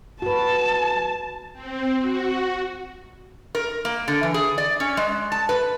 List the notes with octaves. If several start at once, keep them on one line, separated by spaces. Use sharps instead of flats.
F#4 B4 A5
C4
F#4
A#4
A#3
D3
E3
G#4
D5
C#4
G#3
A5
B4